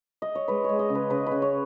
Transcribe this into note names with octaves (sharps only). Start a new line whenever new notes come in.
D#5
C#5
G#3 B4
G#3 C#5
D#5
C#3
B4
C#3 B4
C#3 B4
C#5